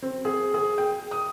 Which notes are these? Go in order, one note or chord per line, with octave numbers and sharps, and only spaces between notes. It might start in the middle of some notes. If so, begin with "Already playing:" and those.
C4
G#4
G#4
G5
D#6